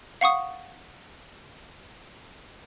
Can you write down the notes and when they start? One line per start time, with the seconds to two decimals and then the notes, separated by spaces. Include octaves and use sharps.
0.21 F5 F#5 C#6 D#6